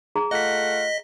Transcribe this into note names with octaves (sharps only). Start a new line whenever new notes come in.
G#4 A#5
A3 F4 D#5 F#5 B6